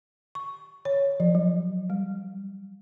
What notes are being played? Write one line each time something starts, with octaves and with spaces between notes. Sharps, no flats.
C#6
C#5
F3
F#3
G3